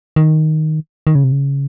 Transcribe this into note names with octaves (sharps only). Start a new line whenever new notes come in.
D#3
D#3
C#3
C3
C#3